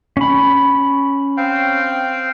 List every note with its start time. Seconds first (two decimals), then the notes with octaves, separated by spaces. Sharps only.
0.17 C#4 B5
1.37 C4 F5 G5